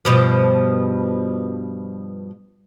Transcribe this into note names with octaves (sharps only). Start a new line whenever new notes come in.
G2 B2 F3